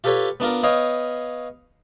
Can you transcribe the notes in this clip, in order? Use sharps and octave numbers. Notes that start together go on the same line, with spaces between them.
F4 G4 A4 B4 C#5
B3 D4 F4 A#4
B3 C#5 D#5 F5 G5